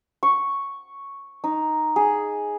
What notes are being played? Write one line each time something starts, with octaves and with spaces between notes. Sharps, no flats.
C#6
D#4
G#4